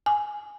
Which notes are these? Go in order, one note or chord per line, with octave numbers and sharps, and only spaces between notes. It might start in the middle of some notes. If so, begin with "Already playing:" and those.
G#5